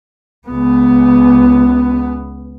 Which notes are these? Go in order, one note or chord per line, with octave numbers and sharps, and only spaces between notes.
C#2 B3